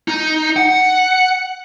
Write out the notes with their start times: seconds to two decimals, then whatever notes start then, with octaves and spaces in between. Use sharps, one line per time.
0.08 D#4
0.56 F#5